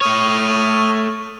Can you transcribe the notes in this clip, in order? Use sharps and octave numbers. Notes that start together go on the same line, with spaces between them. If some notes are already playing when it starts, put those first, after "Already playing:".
A3 C#5 D#6 F6